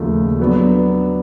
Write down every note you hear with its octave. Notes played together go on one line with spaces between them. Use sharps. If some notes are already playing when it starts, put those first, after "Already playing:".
Already playing: D#2 C#3 F3 A3
F#3 B3 D4